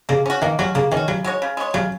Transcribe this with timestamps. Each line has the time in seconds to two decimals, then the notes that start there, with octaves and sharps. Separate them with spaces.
0.09 C#3 A#3
0.26 C#4 F#4
0.42 D#3 A#3
0.59 F#3 C#4 F#4
0.75 C#3 A#3
0.92 D#3 C#4 F#4
1.08 C#3 F#3
1.24 G#3 F#4 C#5
1.42 C#3
1.57 G#3 F#4 C#5
1.74 C#3 F#3